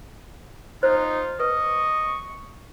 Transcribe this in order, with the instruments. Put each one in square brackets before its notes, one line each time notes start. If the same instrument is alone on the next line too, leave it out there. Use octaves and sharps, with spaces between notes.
[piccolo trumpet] D#4 [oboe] F4 [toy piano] C5
[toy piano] B4 [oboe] D#5 [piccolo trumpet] C#6